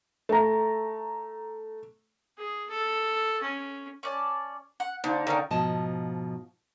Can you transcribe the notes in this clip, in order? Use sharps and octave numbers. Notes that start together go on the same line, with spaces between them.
A3 A#5
G#4
A4
C#4
C#4 D5 A5
F#5
D3 D4 D#4 F4
D3 D#3 C#4 A#4
G#2 B2 F3 D#5 A5